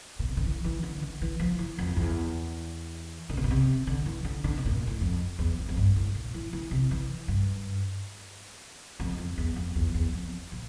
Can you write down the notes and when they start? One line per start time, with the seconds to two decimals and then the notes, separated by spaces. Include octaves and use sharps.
0.19 A#2
0.28 C3
0.37 D3
0.45 E3
0.64 E3
0.83 D3
1.02 D3
1.22 E3
1.40 F3
1.59 E3
1.79 F2
1.97 E2
3.29 D3
3.37 C3
3.44 A#2
3.51 C3
3.87 D3
4.06 E3
4.25 D3
4.44 D3
4.58 C3
4.66 A2
4.73 A#2
4.87 A2
5.01 F2
5.39 E2
5.58 F2
5.69 F2
5.77 G2
5.96 A2
6.15 A#2
6.34 E3
6.53 E3
6.71 C3
6.91 E3
7.28 G2
9.00 F2
9.18 F2
9.38 E2
9.56 F2
9.76 E2
9.94 E2
10.13 F2
10.52 A#2